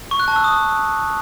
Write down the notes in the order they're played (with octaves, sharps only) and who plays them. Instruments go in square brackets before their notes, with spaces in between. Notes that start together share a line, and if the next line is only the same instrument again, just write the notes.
[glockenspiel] C#6
F#6
A5
E6
D#6